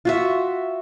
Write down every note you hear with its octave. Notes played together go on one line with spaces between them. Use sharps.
F4 F#4 E5